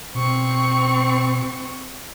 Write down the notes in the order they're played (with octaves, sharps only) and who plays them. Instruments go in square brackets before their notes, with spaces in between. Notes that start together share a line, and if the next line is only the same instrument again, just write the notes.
[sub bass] B2 [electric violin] C4 C#6